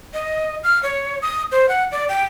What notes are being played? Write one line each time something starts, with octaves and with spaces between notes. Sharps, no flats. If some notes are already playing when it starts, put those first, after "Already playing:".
D#5
F6
C#5
D#6
C5
F#5
D5
G5